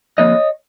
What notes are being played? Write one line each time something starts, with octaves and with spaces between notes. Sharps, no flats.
F2 D3 F3 A#3 C#5 D#5